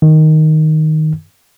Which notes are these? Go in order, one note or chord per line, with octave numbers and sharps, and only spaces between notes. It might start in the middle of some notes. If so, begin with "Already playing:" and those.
D#3